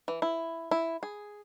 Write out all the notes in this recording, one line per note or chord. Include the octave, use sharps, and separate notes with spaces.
E3
E4
E4
G#4